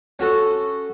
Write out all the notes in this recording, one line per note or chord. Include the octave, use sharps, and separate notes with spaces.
C#4 F#4 A4